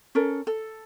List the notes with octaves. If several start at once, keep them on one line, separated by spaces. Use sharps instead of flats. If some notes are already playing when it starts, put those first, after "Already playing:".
C#4 A4 A#4
A4